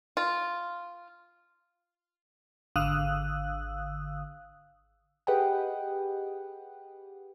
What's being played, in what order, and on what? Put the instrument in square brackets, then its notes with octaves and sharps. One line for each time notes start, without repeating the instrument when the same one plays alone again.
[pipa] F4
[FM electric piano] G#1 D3 F5 D#6 E6 F#6
[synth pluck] G4 G#4 B4 D#5 F#5 G5